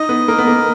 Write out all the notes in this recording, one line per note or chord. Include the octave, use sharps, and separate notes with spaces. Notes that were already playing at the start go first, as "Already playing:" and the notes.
Already playing: D#4 D#5
B3
A#3 A#4
B3
A#3